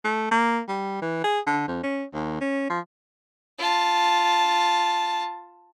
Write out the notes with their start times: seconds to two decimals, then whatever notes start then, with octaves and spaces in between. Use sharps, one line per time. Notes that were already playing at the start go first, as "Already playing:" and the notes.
0.05 A3
0.31 A#3
0.68 G3
1.02 E3
1.24 G#4
1.47 D3
1.68 F2
1.83 C#4
2.14 D#2
2.41 C#4
2.70 F3
3.58 F4 A5